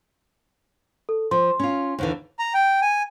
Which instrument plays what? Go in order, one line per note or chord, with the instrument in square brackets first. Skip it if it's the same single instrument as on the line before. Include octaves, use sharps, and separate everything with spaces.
[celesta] A4
[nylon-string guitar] F3 [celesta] C6
[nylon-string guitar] C#4 F4
D#2 D3 E3
[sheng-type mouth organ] A#5
G5
G#5